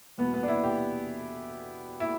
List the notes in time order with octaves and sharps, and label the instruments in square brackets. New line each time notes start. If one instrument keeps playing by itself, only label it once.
[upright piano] E2 B2 B3
B3
D4
E4
G4
E4